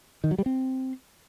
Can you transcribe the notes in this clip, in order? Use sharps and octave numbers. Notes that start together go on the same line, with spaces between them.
D#3
F#3
G3
C4